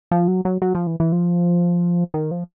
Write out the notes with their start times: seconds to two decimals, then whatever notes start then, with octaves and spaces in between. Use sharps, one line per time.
0.11 F3
0.28 F#3
0.45 F#3
0.62 F#3
0.75 F3
0.87 E3
1.00 E3
1.12 F3
2.14 D#3
2.31 F3